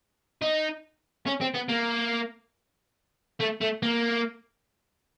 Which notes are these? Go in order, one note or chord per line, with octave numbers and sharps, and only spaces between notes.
D#4
C#4
C4
B3
A#3
A3
A3
A#3